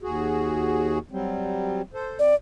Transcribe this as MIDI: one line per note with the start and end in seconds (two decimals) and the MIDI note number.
0.03 0.99 39
0.03 0.99 66
0.03 0.99 68
1.11 1.82 54
1.11 1.82 55
1.11 1.82 60
1.94 2.19 69
1.94 2.19 72
2.19 2.33 60
2.19 2.35 74